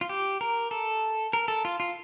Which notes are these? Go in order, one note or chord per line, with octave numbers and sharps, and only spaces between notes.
F4
G4
A#4
A4
A#4
A4
F4
F4